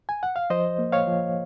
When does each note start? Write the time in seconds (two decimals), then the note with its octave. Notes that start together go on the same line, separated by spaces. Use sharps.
0.09 G#5
0.23 F#5
0.36 F5
0.50 F3 C5 D#5
0.79 A#3
0.92 C#5 F5
1.07 F3